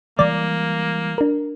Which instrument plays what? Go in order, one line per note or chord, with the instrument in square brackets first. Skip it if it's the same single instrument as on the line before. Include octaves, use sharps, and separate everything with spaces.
[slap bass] E3 G3 G#3 [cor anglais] A#3 [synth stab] D5
[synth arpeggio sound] D4 A#4